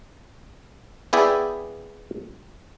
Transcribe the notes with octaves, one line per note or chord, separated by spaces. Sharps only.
B3 E4 G#4 D5 E5 G5